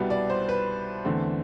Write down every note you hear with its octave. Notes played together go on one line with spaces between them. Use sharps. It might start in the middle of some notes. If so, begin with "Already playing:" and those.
Already playing: C2 B2 G3 B3
D5
C5
B4
E2 D3 A3 C4